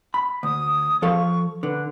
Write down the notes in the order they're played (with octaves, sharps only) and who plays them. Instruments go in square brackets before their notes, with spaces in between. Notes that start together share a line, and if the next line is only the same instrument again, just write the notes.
[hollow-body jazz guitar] B5
[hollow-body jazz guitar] D2 [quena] D#6
[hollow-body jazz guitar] F3 A4 F5 [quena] C#6
[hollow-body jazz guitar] D3 [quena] B4